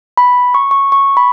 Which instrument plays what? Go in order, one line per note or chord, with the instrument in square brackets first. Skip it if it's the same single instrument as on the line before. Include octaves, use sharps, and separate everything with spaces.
[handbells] B5
C#6
C#6
C#6
B5